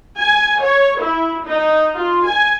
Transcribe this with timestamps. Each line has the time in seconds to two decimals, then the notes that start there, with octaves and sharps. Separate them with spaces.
0.18 G#5
0.61 C#5
1.00 E4
1.47 D#4
1.95 F4
2.26 G#5